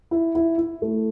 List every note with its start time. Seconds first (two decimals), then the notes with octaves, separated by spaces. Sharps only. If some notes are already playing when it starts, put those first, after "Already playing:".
0.11 E4
0.35 E4
0.58 E4
0.82 A3